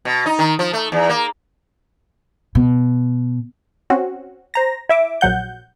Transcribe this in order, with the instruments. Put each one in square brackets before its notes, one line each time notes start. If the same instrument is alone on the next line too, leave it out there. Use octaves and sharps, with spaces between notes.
[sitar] B2
D#4
D#3
F3
A3
E2
A#3
[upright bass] B2
[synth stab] C4 C#4 F#4
C5 A#5 A#6
E4 E5 D6
A#1 F#3 F#5 G6